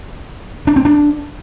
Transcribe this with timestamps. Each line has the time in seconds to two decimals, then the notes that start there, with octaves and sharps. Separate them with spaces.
0.67 D4
0.76 C4
0.85 D4